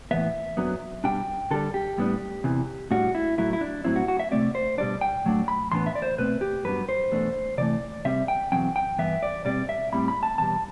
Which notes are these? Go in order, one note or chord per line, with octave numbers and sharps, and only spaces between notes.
A2 E3 B3 E5
F#2 F#3 B3 D4
B2 G3 D4 G5
D3 G3 D4 A4
G4
A2 G3 B3 D4
E2 C3 E3
A2 G3 D4 F#4
E4
A2 F#3 A3 E4
E4
D4
A2 F#3 C4 E4
F#4
F#4
E5
C3 F#3 A3 C4 D5
C5
B2 G3 D4 D5
G5
A2 F#3 A3 D4
B5
A2 E3 B3 D4 C6
E5
D5
C5
B2 A3 C4 B4
G4
G2 F#3 B3 D4 B4
C5
E2 B2 A3 D4
C3 E3 A3 D5
C3 G3 C4 E5
G5
E2 B2 F#3 C4 G5
G5
G2 E3 B3 E5
D5
B2 G3 C4 D5
E5
A2 G3 C4 B5
B5
A5
E2 B2 G3 A5